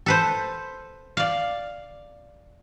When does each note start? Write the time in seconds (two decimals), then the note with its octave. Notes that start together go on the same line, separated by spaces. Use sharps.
0.06 A4 B4 C5
1.17 D5 F5